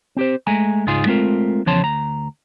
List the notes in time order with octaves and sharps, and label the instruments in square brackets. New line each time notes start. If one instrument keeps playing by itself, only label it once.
[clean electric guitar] C4 G4 C5
G#3 A3 G#5 A#5
C#2 G#2 D#4 F4 G#4 C6
G#3 A3 C4 F4 A#4
E2 C#3 F3 C#5 A5 C6
D2 A#5